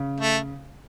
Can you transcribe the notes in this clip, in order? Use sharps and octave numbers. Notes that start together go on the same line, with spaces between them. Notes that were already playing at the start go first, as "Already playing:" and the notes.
Already playing: C#3
A3